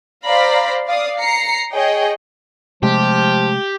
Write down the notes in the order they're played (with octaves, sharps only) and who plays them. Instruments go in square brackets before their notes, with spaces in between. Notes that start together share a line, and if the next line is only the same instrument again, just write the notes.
[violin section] C5 D5 F5 A#5 B5
D5 F5 D#6
A#5 C7 C#7
G#4 C#5 D#5 G5
[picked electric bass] C3 G#3 A3 [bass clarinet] F3 [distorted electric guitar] G4